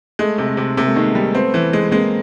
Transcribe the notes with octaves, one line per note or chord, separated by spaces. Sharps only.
G#3 A3
C3
A3
C3
C3 A#3
A3
D#3 G#3 A#3
G3
A3 B3 C4
E3
G#3
G#3 A#3 C4